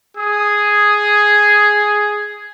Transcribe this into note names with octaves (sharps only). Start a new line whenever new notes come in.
G#4 D#6